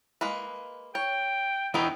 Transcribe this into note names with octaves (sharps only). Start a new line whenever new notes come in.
G#3 A#3 B4
C#5 G5
E2 B3 D#4 E4 G5